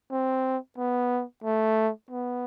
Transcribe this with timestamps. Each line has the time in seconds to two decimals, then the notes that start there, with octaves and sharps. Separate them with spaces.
0.11 C4
0.77 B3
1.44 A3
2.10 B3